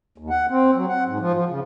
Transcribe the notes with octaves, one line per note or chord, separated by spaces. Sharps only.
D#2
F#5
C4
F#3
F#5
G#2
F3
F3
C#3